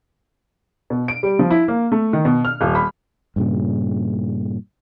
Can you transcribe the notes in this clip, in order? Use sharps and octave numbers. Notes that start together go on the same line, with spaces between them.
B2
D7
G3
F3
E4
A#3
A3
D#3
B2
F6
D#1
B5
G2 A#2 C#3